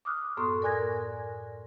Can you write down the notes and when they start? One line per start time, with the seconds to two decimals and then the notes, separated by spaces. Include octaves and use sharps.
0.05 D6 D#6 F6 F#6
0.37 F#2 A2 B3 A4 C6 C#6
0.62 A#4 D5 G#5 F#6 G#6 A#6